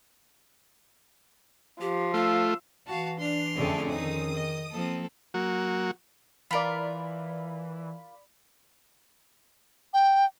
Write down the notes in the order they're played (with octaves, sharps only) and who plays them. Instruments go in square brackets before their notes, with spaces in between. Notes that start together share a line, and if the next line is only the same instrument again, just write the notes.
[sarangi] F3 [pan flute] G4
[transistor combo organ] A3 F4 [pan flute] F5 [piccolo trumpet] E6
[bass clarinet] E3 [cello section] F#4 [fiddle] F5 A5
[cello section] D4 [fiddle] C6 F6
[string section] F2 D3 A3 [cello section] C4 C#4 G#4
[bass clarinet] D#3 [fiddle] D#4 [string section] D#6
[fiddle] D#5
[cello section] F3 A#3 [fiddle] C4 A4
[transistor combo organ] F#3 A#3 F#4
[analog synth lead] E3 [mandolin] F4 A#4 [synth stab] D5 B5
[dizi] G5